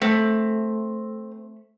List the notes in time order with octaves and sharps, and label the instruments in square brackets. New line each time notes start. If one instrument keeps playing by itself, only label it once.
[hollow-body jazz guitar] A3 [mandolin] C4